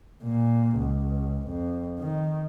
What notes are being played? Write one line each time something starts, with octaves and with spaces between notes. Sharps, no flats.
A#2
C#2
F2
D#3